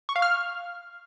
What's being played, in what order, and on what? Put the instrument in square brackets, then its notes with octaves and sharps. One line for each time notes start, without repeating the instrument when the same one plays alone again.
[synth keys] C#6
F5
F6